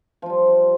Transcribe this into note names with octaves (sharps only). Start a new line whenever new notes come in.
F3 G3 F4